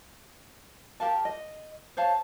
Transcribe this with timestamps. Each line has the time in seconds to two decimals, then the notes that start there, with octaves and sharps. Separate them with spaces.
1.00 G4 A#4 F5 A5
1.25 D#5
1.97 C5 C#5 F5 A5